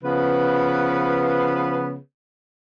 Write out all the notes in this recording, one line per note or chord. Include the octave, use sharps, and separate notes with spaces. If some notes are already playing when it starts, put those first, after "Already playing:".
C#3 F3 B3 B4